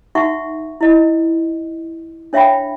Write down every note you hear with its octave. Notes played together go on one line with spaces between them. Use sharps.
D#4 F#4 E5 F#5 C#6
E4 D#5
D4 C#5 E5 F5 G5 B5